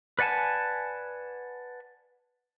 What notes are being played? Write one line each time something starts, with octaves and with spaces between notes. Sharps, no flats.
B4 D5 F#5 G#5 A5